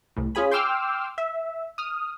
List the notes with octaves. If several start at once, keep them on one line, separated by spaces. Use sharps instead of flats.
C2 A2
C#4 F4 G#4 G#5 B5
G5 C6 D6 E6 F6 G6
E5
D#6 F6